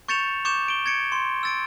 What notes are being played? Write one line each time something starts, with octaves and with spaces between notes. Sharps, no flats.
C#6 G6 A6 C#7 E7 F7
C#6 D6 G6 E7
D7 G7
G#6 A6 C#7 D7
C6
E6 A6 D7